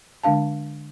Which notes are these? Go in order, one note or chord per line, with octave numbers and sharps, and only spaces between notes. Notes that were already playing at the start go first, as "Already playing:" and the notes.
D3 G#3 D4 F5 A5